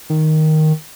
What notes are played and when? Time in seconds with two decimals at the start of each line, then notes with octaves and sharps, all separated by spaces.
0.10 D#3